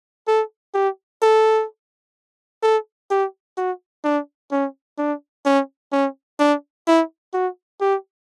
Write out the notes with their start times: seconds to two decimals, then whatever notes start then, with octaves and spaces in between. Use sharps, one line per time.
0.28 A4
0.74 G4
1.22 A4
2.63 A4
3.11 G4
3.57 F#4
4.04 D4
4.52 C#4
4.98 D4
5.45 C#4
5.93 C#4
6.40 D4
6.88 E4
7.34 F#4
7.81 G4